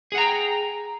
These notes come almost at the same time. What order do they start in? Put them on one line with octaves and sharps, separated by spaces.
G#4 F#5 A#5 G5